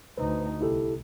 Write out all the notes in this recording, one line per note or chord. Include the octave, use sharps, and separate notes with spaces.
D2 D#4 B4 C5
C2 E4 G4 A4